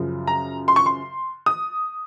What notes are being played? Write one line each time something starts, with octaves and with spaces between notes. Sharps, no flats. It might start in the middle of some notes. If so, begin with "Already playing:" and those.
Already playing: F#2 C#3 F3
A#5
C6
C#6
C6
D#6